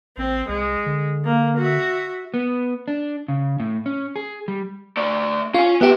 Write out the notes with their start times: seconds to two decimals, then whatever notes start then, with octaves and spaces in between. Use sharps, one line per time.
0.17 A1 C4
0.49 C2 G#3
0.86 D3
1.24 A#3
1.57 F#4 E5
2.34 B3
2.88 D4
3.28 C#3
3.60 A2
3.86 C#4
4.16 G#4
4.48 G3
4.97 A3 D5
5.54 C#4 F4 G#5
5.81 B2 B3 G4 E5